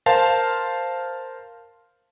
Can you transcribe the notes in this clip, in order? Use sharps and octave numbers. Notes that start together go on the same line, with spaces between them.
A#4 C5 F5 A5 C6